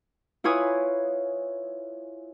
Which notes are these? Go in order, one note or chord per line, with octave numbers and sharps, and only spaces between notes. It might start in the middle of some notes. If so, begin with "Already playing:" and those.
E4 F4 B4 C#5 G#5 D#6